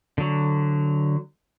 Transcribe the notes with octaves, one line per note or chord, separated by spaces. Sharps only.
D3 F#3